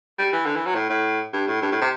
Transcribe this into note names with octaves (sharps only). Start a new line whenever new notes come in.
G3
E3
D3
E3
F#3
A2
A2
G2
A2
G2
A2
C3